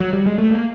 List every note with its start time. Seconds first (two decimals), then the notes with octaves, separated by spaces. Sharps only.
0.00 F#3
0.13 G3
0.26 G#3
0.38 A3
0.51 A#3